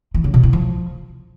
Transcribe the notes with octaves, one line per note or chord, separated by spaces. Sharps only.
E3
C#3
B2
E4
F3